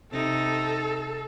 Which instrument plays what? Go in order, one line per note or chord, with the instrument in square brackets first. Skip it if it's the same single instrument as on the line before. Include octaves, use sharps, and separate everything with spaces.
[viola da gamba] C3 D#4 [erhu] A4